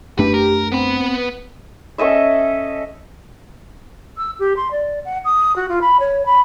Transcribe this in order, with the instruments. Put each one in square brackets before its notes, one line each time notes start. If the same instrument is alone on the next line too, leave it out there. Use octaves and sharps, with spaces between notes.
[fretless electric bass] F#2 A3 D4 [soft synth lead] G4 [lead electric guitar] B4
[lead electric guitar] A#4
[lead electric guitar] B3 B4 [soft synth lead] C4
[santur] C#4 A4 D#5 E5
[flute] E6
G4
C6
D5
F#5
D#6
F#4
F4
B5
C#5
B5